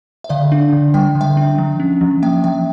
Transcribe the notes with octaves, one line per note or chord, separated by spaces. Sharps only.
E5
D3 D5 F5
D4
D3
G3 G5
D3
E5 G5
D4
F3
C#4
F3
A#3 E5 G5
F3 E5 G5